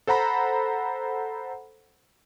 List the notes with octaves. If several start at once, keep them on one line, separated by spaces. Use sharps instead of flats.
A4 C5 F#5 A#5 B5